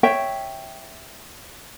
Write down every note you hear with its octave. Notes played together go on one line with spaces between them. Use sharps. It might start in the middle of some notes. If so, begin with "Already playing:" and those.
C#5 E5 G5